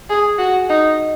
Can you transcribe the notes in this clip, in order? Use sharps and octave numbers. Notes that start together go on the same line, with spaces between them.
G#4
F#4
D#4